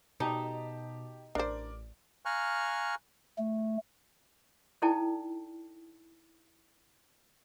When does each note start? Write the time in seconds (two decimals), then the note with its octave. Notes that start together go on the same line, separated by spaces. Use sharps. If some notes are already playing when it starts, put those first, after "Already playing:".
0.20 B2 D#4 G4 A5
1.35 A1 D4 A#4 C5 D5
2.25 F5 G#5 A#5 C#6 F6 F#6
3.38 A3
4.82 D#4 E4 A4 D5 G5 A5